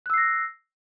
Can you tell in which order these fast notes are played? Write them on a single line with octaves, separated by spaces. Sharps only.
F#6 E6 C7 A#6